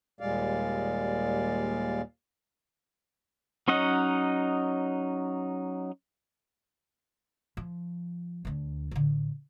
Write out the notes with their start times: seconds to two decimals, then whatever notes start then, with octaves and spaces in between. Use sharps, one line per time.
0.21 D#2 A#2 G3 G#3 D5 F5
3.68 F#3 C#4 D#4 D#5 F#5
7.57 F3
8.45 D2 D4
8.91 A1 D3